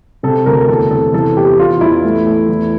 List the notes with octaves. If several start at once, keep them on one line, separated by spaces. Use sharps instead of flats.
C3 A4
D2 A#4
E2 A4
C3 A4
E3 A4
E2 G4
E2 F4
E2 E4
A3
A3
E2